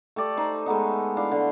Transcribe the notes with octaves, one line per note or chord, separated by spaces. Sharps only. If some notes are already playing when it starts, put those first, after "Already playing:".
A3 G4 D5
D#4 C5
G#3 A3 B3 D#4
D4 E4 F5
D3 C6